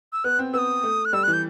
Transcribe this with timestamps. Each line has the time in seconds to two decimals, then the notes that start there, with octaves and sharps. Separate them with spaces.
0.13 E6
0.24 B3 F#6
0.39 C4
0.54 B3 D#6 E6
0.83 A3
1.05 F#6
1.13 G3 E6
1.23 F#6
1.28 E3
1.33 G6